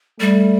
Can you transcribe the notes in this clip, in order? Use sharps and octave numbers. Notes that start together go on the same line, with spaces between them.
G3 A3